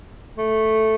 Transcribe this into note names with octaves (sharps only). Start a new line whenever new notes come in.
A3